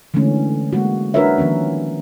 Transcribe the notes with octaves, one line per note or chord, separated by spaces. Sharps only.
D3 E3 G#3 A3 C#4
G#3 A#3 F#4
D4 F#4 A#4 B4 C#5 E5
D#3 F3 A#3 C#4